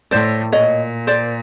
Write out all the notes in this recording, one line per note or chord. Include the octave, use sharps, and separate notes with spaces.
A2 C5 D5
A#2 C#5 D#5
C5 D5